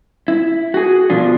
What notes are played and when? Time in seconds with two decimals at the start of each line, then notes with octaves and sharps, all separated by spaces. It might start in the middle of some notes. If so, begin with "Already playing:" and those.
0.28 E4
0.74 F#4 G#4
1.10 B2 D3 F3 D4 F4